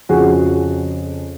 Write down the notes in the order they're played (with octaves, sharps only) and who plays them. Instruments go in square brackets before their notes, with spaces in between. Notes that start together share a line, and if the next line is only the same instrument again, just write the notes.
[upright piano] F2 C#3 F3 F#4 G#4